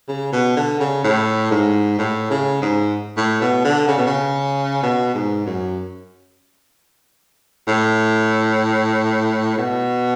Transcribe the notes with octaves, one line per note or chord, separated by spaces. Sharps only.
C#3
B2
D3
C#3
A2
G#2
A2
C#3
G#2
A2
B2
D3
C#3
B2
C#3
B2
G#2
F#2
A2
B2